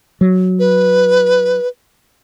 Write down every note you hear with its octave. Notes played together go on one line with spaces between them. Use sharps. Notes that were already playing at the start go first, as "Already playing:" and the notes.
F#3
B4